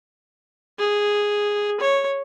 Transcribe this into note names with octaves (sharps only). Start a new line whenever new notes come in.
G#4
C#5